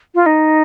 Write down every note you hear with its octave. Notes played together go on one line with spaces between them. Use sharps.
F4
D#4